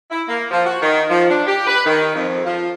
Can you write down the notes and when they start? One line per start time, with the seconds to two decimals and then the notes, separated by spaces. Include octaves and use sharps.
0.11 E4
0.29 A#3
0.51 F3
0.66 F#4
0.82 D#3
1.10 F3
1.30 D4
1.47 G4
1.67 B4
1.86 D#3
2.15 F2
2.45 F3